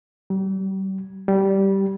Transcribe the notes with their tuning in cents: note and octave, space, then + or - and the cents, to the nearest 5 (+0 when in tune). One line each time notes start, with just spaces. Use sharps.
G3 -35
G3 -10